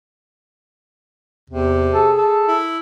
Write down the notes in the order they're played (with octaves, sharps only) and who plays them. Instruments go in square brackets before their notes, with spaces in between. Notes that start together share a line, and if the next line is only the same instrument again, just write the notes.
[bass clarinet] E2 [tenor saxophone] C3
[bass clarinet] G#4 [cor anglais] A4
[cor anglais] A4
[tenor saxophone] E4